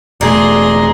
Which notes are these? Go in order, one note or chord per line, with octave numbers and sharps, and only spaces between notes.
E1 A3 G#4 D5 A#5 C6